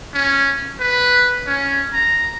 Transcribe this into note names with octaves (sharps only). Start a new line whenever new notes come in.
C#4
B4
C#4
A#5